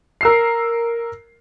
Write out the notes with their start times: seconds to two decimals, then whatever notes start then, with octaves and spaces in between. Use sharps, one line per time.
0.21 A#4 E6 C7